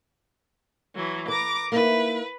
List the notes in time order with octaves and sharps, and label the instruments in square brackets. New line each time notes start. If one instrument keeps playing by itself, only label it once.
[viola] E3 F#3
[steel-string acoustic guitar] B4 [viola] A#5 D6
[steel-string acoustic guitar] A#3 D#4 E4 [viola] B4